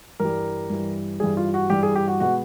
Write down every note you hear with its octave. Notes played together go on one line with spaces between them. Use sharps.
G2 E3 G3 A#4
G2 E3 G3
G2 E3 G3 G#4
F4
F#4
G2 E3 G3 G4
G#4
G4
F#4
B2 G#3 B3 F#4